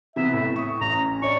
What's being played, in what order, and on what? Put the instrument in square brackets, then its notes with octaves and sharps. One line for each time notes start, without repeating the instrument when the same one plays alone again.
[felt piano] C3 E3 B3 [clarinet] E5
[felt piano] A2 [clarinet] A3
[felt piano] C#6 D#6
[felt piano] A1 [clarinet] A#5
[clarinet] C#4
[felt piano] D4 C#5 D5 [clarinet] C#6